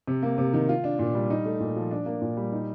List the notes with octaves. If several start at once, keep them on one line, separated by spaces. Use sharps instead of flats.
C3
A#3
C3
D#3
F4
D4
A#2
G3
D#4
A3
A#2
F3
D4
A#3
A#2
G3
D#4